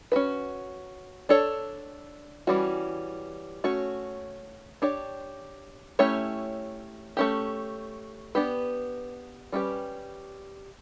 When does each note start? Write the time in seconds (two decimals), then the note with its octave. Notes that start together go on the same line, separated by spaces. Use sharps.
0.12 C#4 F#4 B4
1.29 D4 A4 C#5
2.47 E3 G3 C#4 F#4
3.64 A3 C#4 F#4 C#5
4.82 D4 G4 C#5
5.99 A3 C#4 E4 G4 C#5
7.17 A3 C#4 G4
8.35 B3 D4 G4 B4
9.52 G3 C#4 G4 B4